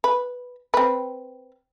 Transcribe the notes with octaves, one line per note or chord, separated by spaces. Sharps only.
B4
C4 B4